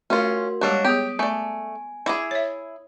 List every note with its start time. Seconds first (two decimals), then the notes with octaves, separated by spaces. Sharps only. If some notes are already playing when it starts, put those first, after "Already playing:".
0.10 A3 C#4 F4 F#4 A#4 C6
0.61 G3 G#3 A#3 D4 F#4 G4 C#5
0.85 B3 G4 G#4 D#6 D7
1.19 A3 D5 G#5
2.06 E4 G#4 D5 D6
2.31 C#5 E5